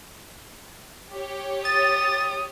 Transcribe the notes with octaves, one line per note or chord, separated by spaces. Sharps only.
G4 C#5
D#6 A6